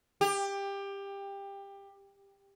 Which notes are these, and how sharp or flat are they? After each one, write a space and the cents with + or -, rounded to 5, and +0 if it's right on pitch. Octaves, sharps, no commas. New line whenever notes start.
G4 +20